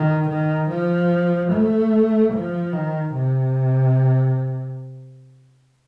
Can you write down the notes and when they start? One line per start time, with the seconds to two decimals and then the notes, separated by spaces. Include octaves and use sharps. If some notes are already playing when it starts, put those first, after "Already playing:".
Already playing: D#3
0.30 D#3
0.70 F3
1.52 A3
2.34 F3
2.73 D#3
3.15 C3